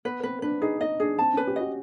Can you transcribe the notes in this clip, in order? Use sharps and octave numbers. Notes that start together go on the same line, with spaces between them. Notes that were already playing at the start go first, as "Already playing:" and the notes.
B3 B4
C4 B4
D4 B4
D#4 G#4
D#4 D#5
D4 G#4
C4 A5
C#4 B4
G4
F#4 D#5